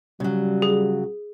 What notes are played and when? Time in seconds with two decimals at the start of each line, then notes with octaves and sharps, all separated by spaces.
0.20 C#3 F#3 G3
0.62 G#4